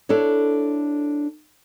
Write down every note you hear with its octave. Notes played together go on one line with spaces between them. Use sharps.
D4 E4 A4 C#5